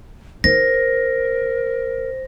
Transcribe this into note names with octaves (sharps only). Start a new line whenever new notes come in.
D#4 A#4 C5 A#6